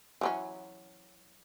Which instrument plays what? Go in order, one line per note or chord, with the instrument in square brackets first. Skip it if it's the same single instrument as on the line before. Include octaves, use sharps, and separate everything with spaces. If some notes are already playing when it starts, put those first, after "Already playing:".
[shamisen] E3 F#3 C#4